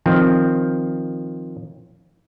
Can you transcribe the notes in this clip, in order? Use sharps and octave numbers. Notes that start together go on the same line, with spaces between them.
D#3 F3 C4